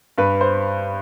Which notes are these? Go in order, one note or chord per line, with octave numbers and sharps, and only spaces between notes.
G2 B4
C5